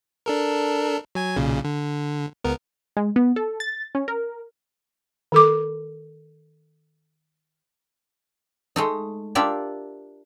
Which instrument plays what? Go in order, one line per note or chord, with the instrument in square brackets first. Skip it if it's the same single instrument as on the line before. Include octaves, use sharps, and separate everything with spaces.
[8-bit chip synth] D4 A4 A#4
F#3 G#5 G#6
B1 A#2 C#3
D3
C#2 B3 A#4
[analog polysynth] G#3
B3
A4
A6
C#4
A#4
[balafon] D#3 A4 D6
[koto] G#3 A3 D#4
D4 F4 G4 A#4 E5